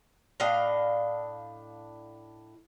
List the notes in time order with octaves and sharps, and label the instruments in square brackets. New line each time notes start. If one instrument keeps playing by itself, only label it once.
[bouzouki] A2 D4 D#5 F5